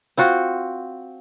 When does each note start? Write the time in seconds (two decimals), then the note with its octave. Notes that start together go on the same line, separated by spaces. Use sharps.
0.17 C4 F4 F#4